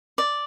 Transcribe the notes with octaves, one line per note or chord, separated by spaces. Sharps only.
D5